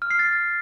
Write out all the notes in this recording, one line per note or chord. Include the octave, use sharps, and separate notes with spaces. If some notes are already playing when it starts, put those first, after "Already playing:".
F6
C7
A6